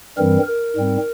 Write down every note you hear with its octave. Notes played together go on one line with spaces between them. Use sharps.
G2 E3 G3 C4 A#4
A#4
G#2 G3 C4